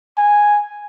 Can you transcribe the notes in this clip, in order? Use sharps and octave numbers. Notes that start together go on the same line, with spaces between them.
G#5